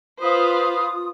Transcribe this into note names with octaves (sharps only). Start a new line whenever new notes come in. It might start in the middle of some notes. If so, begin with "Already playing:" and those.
F4 B4 C5 F5 D#6